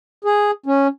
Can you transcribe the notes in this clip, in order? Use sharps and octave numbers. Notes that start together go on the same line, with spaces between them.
G#4
C#4